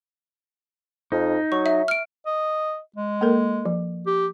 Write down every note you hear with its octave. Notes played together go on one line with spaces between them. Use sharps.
F2 D#4
F#3 C#6
E5
F6 D7
D#5
G#3
A#3 A4 A#4
F3
G4